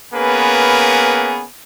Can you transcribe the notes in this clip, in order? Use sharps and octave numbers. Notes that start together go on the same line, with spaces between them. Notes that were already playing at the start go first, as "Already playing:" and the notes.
A#3 B3 C#4 G#4 B4